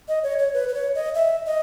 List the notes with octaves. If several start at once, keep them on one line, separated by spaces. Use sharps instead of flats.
D#5
C#5
C#5
B4
B4
C#5
D#5
E5
D#5